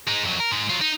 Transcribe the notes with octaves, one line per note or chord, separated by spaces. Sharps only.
G#3 D#4
F2 F#3
A#4
G#2 G#3
F#3 F4
D#4